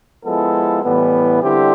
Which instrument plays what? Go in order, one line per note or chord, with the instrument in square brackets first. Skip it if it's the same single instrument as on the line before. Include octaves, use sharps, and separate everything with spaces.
[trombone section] F3 G#3 B3 E4 A4
A2 E3 G3 B3
D3 G3 C4 E4 G4